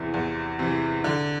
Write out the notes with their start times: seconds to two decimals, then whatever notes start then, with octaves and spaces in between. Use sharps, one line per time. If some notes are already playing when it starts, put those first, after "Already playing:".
Already playing: E2 C3 E3
0.14 E2
0.59 C3 E3
1.04 D3